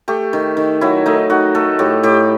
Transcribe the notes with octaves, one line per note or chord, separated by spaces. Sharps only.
A3 G4
D#3
D#3
F#3 E4
A3 D#4
D#3 F#4
A3 A4
A2 G4
A2 G4